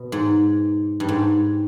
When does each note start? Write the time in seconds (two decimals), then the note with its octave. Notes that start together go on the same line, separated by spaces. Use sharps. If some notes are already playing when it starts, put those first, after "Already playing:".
Already playing: B2
0.12 G#2
1.00 G2
1.09 G#2